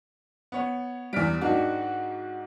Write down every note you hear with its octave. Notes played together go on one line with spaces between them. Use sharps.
B3 C#5
E2 G3 F6 B6 D7
G#2 D#3 D4 F#4